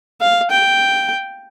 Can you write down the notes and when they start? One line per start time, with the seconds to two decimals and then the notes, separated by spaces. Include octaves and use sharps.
0.21 F5
0.51 G5